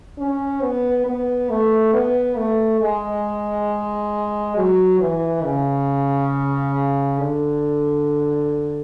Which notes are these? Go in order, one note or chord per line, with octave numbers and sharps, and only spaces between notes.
C#4
B3
B3
A3
B3
A3
G#3
F#3
E3
C#3
D3